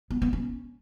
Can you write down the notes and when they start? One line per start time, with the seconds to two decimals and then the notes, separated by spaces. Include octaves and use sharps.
0.10 B3
0.22 B3
0.33 C#4